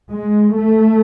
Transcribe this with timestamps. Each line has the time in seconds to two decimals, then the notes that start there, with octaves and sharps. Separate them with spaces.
0.12 G#3
0.56 A3